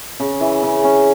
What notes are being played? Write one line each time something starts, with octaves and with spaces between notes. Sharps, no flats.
C#3
E3
C#3
C#4